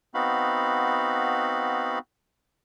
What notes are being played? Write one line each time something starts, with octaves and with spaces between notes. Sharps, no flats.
B3 C4 D#4 F#4 F5 B5